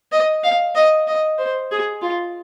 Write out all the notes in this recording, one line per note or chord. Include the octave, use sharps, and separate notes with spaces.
D#5
F5
D#5
D#5
C5
G#4
F4